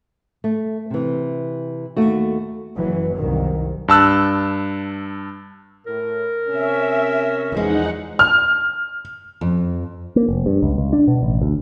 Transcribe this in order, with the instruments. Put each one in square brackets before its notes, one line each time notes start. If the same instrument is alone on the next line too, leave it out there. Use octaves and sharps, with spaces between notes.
[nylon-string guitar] A3
C3 E3
D#2 A3 F#4
[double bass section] F#1 E3 F#3
C2 D#3
[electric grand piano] G2 A5 E6 F#6
[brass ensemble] A2 [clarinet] A#4
[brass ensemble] C3 C#4 [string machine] E5
[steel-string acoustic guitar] E2 F3 G#3 [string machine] D#4 F#5
[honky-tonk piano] F6
[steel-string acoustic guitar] F2
[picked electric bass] A#3
F1
G2
C#2
C#2
D4
B2
A1
D2